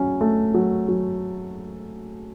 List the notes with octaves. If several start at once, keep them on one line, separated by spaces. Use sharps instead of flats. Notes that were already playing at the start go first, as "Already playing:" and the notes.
Already playing: F#3 C#4
A3
F#3
F#3